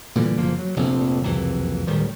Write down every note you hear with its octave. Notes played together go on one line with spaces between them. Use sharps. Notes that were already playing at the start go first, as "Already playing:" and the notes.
A#2 D3 E3 G3
F#1 F3 A#3
F#3
F1 A#1 F2 C4
F#1 C2 F2 E3
D1 D#3 G3